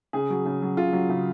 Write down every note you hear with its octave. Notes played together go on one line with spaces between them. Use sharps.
C#3 G#4
F#3
C#3
F#3
C#3 F4
F#3
C#3